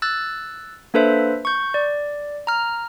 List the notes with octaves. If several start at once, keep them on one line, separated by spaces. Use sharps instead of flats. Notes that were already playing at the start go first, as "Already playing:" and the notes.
E6 F#6 A6
A#3 D4 A4 B4 C5 E5
C#6 G6
D5
A#5 F6